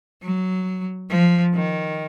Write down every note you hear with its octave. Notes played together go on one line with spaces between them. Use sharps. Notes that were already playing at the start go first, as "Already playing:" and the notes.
F#3
F3
D#3